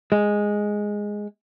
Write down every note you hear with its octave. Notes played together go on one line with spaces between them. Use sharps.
G#3